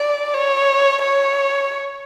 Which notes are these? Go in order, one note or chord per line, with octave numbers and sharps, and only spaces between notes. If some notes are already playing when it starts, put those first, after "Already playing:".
Already playing: D5
C#5
C#5